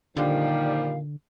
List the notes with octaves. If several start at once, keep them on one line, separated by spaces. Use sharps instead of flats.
A#2 D3 D#3 F3 G3 F5